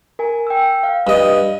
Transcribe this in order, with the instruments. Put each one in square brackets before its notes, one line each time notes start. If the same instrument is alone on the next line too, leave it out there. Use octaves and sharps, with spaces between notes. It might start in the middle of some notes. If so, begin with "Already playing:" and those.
[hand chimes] A#4 G#5
G5 E6
F5
[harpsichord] G2 D#5